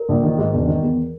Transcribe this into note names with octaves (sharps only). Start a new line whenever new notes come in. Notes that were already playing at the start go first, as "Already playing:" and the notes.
Already playing: A#4
A#1
D#3
G#2
E1
D#3
E2